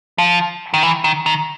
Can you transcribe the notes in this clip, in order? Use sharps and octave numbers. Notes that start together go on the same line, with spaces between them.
F3
D#3
E3
D#3
D#3